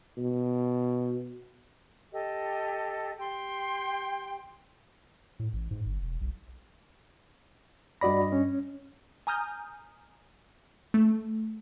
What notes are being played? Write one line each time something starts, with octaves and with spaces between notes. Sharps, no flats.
B2
G4 A4 D#5
G4 G5 C6
A2
A1
G#2
G1
E1
B1
G2 F#4 D5 D#5 B5 A#6
C#4
G#5 A#5 D#6 F6 G6
A3